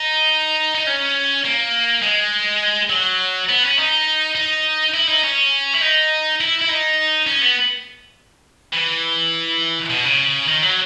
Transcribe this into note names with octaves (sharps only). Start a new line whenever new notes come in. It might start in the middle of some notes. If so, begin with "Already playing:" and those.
Already playing: D#4
D#4
C#4
A#3
G#3
F#3
B3
C#4
D#4
D#4
E4
D#4
C#4
E4
D#4
E4
E4
D#4
C#4
B3
E3
B2
C#3
D#3
F#3